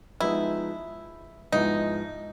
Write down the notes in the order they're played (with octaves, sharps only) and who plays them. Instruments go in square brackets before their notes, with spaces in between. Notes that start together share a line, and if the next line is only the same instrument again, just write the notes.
[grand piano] F3 G#3 B3 D#4 [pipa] E4
[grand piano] G#2 F3 G#3 B3 E4 [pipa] D#4